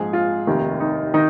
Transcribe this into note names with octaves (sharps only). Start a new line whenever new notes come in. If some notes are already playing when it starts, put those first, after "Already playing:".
Already playing: A#1 G#2 F3 G#4
F4
F1 D#2 D#3
D#4
D#3 D#4